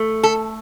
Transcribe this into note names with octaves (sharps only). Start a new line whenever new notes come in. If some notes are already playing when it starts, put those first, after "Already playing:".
Already playing: A3
A4